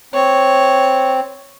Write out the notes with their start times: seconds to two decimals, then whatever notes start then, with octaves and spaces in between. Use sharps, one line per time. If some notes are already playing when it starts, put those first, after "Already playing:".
0.14 C4 C#5